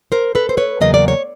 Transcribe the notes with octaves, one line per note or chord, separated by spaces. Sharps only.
A#4 C5
A4 B4
C5
B4 C#5
E2 C#3 F#3 A#3 D#5
D5
C#5